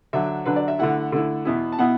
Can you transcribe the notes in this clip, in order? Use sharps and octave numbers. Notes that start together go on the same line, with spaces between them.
D3 F#3 D4 E5
D3 F#3 D4 B4
D5
E5
D3 A3 E4 F#5
D3 A3 E4
E2 B2 B3 E4
A5
B2 B3 E4 F#5